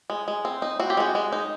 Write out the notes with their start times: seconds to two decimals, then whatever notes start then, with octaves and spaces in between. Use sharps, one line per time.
0.10 G#3
0.28 G#3
0.45 C4
0.62 D#4
0.80 C4 F#4
0.90 G4
0.97 G#3 F#4
1.15 G#3
1.32 D#4